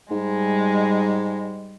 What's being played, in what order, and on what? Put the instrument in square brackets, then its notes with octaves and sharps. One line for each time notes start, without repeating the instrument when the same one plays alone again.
[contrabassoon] G#2 [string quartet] G3 G#3